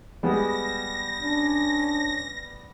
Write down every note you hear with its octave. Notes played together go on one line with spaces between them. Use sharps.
G3 G#3 B3 A#6
C#4 D4